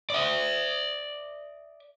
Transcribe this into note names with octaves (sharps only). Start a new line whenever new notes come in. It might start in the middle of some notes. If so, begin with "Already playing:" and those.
D5 E5